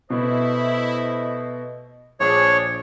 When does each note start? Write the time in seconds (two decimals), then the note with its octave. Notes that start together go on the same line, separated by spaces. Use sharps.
0.10 B2 A3 E4 C5 D#5
2.20 A#1 D4 G#4 C#5